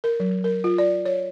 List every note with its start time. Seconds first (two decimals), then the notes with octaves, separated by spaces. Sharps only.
0.04 A#4
0.20 F#3
0.44 A#4
0.64 F4
0.78 D5
1.06 C#5